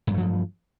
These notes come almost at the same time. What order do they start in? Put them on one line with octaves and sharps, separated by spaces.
G2 F#3 A3 F3